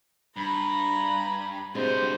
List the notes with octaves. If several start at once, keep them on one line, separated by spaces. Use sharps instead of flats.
G2 A#5 B5
D2 G2 C3 G#3 B3 C5